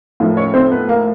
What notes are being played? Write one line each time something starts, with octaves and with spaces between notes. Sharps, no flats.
A2 F3 A#3
C#4 C#5
C4 C5
B3 B4
A#3 A#4